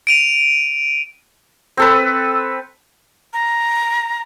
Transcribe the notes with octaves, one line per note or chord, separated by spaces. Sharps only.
D7 D#7 F7
C4 A4 B4
A#5